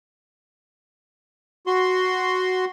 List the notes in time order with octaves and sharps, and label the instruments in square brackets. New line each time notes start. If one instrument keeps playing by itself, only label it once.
[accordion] F#4 C6